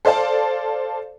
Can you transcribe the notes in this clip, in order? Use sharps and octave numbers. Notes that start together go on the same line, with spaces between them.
A4 C5 D5 F5 A5